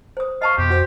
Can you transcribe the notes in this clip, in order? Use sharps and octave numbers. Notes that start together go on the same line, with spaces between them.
C5 D#6
D#5 F5 A5 C#6
F2 B2 G4 C6
F#4 C5